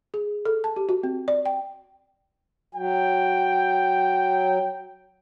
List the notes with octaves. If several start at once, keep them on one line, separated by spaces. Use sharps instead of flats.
G#4
A4
A5
G4
F#4
C4
D5
G5
F#3 G5